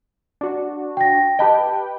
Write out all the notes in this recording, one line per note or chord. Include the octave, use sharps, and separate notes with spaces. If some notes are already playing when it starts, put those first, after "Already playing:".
D4 F#4
G5 A#6
G4 B4 D#5 G5 A5